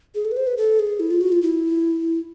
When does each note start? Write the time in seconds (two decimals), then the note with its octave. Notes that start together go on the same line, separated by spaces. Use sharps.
0.15 G#4
0.25 A4
0.31 B4
0.37 C5
0.47 B4
0.57 A4
0.79 G#4
1.00 E4
1.10 F4
1.21 F#4
1.32 F4
1.42 E4